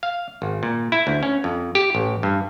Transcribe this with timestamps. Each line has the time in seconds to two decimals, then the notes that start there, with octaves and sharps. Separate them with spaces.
0.03 F5
0.42 G#1
0.63 A#2
0.92 E4
1.07 D2
1.23 C#4
1.44 F2
1.75 G4
1.95 A1
2.23 G2